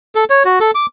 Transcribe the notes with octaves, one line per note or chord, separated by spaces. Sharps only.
A4
C#5
F#4
A4
D6